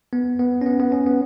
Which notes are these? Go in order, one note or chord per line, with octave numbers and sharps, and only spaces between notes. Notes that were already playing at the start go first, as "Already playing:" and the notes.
B3
B3
C#4
B3
B3
C#4
B3